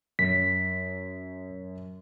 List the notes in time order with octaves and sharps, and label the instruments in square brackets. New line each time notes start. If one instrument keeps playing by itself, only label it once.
[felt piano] F#2 [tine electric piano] B6